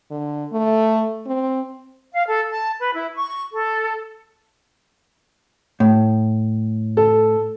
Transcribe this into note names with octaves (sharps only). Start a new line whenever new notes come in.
D3
A3
C4
F5
A4
A5
B4
E4
C#6
A4
A2
A4